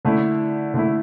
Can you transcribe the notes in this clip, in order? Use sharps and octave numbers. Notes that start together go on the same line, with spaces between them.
D3 A3 E4
D3 A3 E4